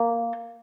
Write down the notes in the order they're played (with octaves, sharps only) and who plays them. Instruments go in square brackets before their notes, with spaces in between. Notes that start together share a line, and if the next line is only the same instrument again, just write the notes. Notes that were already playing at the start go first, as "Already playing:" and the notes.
Already playing: [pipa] A#3